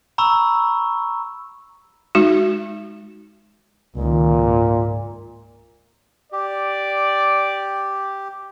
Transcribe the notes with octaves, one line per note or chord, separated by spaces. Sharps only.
A#5 B5 C#6 E6
G#3 D#4 F#4
C#2 A#2 D#3
G#2
G4 D5